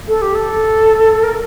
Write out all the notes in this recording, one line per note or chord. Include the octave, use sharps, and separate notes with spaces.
A4
G4
A4
A#4